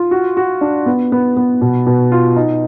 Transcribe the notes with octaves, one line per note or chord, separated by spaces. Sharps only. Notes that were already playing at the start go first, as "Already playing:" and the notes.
Already playing: F4
F#4
F#4
D4
B3
B3
B3
B2
B2
F4
D#4